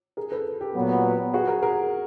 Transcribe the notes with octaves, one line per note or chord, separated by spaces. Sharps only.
G#4 A#4
A4 B4
G4 A4
A#2 F#3 B3
F#4 G#4
G#4 A#4
G#4 A#4